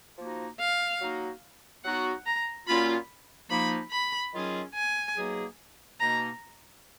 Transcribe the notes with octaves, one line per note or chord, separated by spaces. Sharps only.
F3 A#3 D#4 F#4
F5
F#3 A#3 D#4 F#4
F#3 B3 D#4 F#4 F#5
A#5
A#2 F#3 A#3 C#4 F4 B5
F3 A#3 D#4 B5
B5
D#3 F#3 C#4 F4 G#4
G#5
B2 F#3 A#3 D#4 G#4
B2 A#3 D#4 A#5